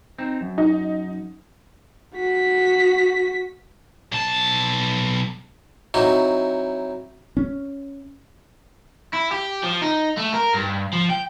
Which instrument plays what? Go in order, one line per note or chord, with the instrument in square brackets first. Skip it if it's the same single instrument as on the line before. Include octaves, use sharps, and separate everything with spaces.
[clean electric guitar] C4 D#4
F#2
[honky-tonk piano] D#4
[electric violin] F#4 B6
[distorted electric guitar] B1 A5
[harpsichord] F#3 C4 D#4 E4 F#4
[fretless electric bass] C#4
[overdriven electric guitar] E4
G4
F3
D#4
A3
A#4
G2
F3
G5